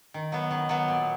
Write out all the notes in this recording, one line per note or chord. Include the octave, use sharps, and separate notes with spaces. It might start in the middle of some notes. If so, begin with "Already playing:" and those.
D#3
F#3 B3
D#3
F#3 B3
A#2